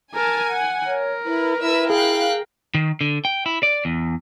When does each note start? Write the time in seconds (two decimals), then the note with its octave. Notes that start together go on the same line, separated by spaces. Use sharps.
0.14 A#4 G#5 A5
0.49 F#5
0.87 A#4 C#5
1.25 E4 B4
1.61 E4 B4 E5 E6
1.90 G#4 F5 G5 F#6
2.74 D#3
3.01 D3
3.25 G5
3.46 E4
3.63 D5
3.85 E2